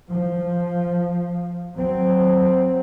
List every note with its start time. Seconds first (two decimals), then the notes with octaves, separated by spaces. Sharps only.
0.10 F3
1.76 F#3 C4